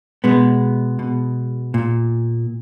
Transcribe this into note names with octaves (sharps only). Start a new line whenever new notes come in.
B2 G#3 B3
B2
A#2